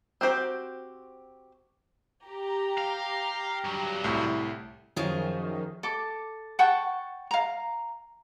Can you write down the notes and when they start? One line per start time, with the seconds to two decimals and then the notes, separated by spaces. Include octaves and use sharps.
0.21 C4 F#4 G4 C5
2.27 G4 A#5
2.78 F5
3.65 G2 F#3
4.04 C2 A2
4.96 F#2 D#3 F3 C#4 G#4
5.83 A4 D6
6.59 F#5 G5 A5 C#6
7.31 F5 A#5